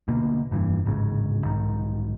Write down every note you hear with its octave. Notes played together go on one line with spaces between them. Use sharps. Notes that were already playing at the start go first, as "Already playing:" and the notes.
D2 B2 A#3
F1 G2 E3
D1 G#1 G#2 C#3
B1 G#2 D#3